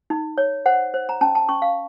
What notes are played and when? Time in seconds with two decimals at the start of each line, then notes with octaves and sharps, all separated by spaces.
0.10 D#4
0.38 C#5
0.66 C5 F#5
0.94 C5
1.09 A#5
1.21 C#4 A5
1.35 A5
1.49 C#4 C#6
1.62 F5